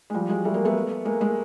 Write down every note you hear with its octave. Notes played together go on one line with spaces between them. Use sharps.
G#3
F3 G3
F#3 G#3
G3 A3
G#3 A#3
A3 B3
G#3 A#3
G#3 A#3